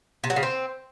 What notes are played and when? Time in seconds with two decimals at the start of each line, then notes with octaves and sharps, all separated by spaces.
0.24 C3
0.30 F#3
0.36 C#3
0.43 C4